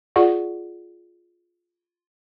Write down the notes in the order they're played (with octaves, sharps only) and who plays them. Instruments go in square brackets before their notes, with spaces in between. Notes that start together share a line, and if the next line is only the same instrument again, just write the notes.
[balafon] F4 G#4 D5 F#5 C#6